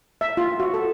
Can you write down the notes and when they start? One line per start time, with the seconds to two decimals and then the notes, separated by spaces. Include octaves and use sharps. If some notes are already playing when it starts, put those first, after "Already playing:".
0.21 E5
0.37 F4
0.60 F#4
0.74 A4